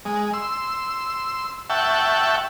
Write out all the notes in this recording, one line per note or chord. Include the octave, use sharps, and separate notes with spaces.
G#3
C6 E6
E5 F#5 G5 A5 C#6